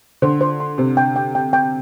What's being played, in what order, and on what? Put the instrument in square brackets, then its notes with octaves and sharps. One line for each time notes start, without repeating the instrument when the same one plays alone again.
[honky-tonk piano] D3 [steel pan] C5
[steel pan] C5
C6
[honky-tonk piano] C3 [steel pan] C5
[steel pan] G5
G5
G5
G5